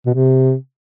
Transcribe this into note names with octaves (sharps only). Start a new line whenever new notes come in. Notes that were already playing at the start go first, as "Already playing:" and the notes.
B2
C3